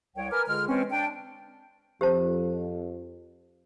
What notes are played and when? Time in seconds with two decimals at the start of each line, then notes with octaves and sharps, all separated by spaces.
0.16 C2 C#5 G5
0.31 A#4 B4 G#5 A#5 D6 F6
0.47 C#2 D3 G#3 G#4 F6
0.68 E3 G#3 C4 C#4
0.91 D4 G5
2.01 F2 G4 C5 A5